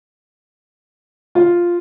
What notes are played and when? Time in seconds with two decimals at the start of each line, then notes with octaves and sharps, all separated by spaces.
1.35 F4